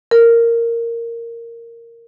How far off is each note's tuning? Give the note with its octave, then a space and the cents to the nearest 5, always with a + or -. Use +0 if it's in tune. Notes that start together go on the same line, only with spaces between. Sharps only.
A#4 -10